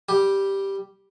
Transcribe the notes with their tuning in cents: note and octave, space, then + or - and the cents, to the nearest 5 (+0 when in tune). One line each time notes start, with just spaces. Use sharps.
G3 +0 G4 +0